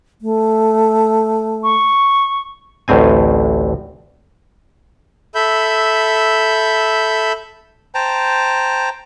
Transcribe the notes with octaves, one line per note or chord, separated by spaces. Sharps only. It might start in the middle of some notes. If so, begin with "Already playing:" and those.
A3
C#6
A1 D2 A2 C4 G#5
A4 E5 B5 G6
C5 G5 A5 A#5